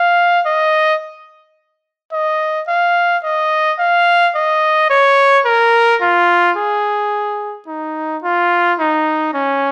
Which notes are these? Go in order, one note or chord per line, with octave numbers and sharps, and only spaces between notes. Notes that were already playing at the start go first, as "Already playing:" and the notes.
Already playing: F5
D#5
D#5
F5
D#5
F5
D#5
C#5
A#4
F4
G#4
D#4
F4
D#4
C#4